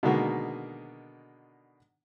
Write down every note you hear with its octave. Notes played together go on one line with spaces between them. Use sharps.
B2 D3 D#3 G#3 A#3 F#4